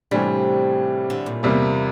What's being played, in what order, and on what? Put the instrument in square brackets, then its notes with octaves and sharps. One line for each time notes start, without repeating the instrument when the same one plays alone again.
[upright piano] A2 E3 G3 D4 [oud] C3
[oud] D3
A#2
[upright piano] E2 C3 G3 A#3